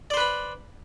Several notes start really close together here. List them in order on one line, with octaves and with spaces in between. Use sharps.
D5 C5 B4 B5